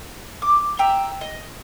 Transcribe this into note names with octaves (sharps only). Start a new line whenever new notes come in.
D6
E5 G5 A#5
D#5